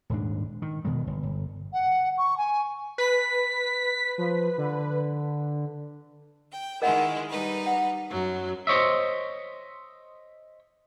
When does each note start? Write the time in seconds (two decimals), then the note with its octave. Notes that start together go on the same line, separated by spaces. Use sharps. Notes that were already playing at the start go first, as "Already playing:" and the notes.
0.10 D#1 G#2 D4
0.62 D#3
0.85 E1 B2 D#3 G#3
1.07 G1
1.23 G1
1.73 F#5
2.18 C#6
2.38 G#5
2.98 B4 B6
4.18 F3
4.58 D3
6.51 G5
6.82 D#3 G#3 E4 A#4 D#5 F#5
7.29 G3 D#4 B4
7.66 F#5
8.10 F#2 F#3
8.67 C5 C#5 D#5 E5